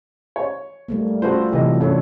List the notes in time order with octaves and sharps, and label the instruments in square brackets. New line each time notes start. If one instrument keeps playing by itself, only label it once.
[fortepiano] C#5
[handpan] G3 A3 A#3
[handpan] F4 A4 [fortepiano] F#4 B4 C5
[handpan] C3 E3 F#3 [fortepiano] G4 B4 D#5
[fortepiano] F#2 [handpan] D4 A4 C#5